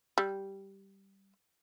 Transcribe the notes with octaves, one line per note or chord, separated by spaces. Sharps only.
G3